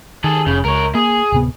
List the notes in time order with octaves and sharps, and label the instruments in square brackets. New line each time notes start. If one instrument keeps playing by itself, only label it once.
[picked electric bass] D#3 [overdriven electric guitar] G#4 A4
[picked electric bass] F1 [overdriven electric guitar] C#3
[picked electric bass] C#2 [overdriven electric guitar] A#4 C#5
[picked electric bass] A#3 [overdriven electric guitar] G#4
[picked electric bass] D1 C3 B3